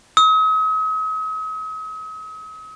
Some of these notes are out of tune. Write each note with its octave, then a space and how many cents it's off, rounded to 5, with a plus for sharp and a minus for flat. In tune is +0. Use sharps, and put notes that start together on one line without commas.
D#6 +45